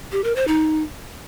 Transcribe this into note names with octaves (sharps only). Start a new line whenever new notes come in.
G4
A#4
C5
D#4